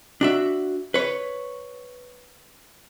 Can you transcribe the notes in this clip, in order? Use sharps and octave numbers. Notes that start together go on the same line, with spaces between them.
D4 F#4 E5
B4 C#5